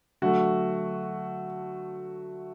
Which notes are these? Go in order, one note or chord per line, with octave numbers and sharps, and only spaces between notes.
D3 F#3 A3 F#4